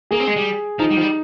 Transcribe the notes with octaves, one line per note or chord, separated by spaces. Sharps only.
A#3 G#4
C4
G#3
G3
F3 D#4
G3
F3
G3